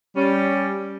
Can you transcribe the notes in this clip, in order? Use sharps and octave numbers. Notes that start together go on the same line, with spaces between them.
G3 C#4